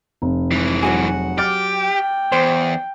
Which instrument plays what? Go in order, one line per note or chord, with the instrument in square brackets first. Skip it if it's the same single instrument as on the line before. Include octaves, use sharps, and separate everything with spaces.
[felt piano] F1
[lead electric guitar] G#2 E3
[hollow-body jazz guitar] F#3 F#4 G#4 [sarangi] F#5
[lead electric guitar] G4 [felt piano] D6 F6 A6
[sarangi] G5
[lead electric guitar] E2 [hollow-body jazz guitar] C5